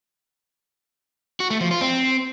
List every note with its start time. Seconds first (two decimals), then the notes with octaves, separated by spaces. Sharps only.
1.40 F#4
1.50 A3
1.61 F3
1.71 F4
1.81 C4